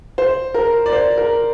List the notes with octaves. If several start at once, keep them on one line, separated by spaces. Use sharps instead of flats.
C5
A#4
D5
C5
A#4